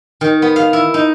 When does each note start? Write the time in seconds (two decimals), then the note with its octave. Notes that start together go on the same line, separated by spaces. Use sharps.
0.21 D#3
0.42 B3
0.56 F5
0.73 E4
0.94 D#4